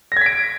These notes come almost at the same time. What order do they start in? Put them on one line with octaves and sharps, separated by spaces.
A#6 G#6 B6 D7